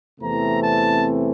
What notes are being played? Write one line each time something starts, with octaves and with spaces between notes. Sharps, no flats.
E2 C3 E3 A3 C4 A#5
A5